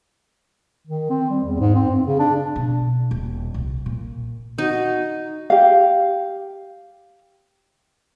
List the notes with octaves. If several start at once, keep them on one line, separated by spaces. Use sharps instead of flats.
D#3
C4
G3
E2
G#2
C4
G2
C#3
D4
B2
D#1
C2
A#2
D#4 F#4
G4 F5